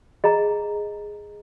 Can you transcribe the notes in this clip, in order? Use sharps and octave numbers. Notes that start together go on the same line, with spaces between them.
G#4 D#5 A#5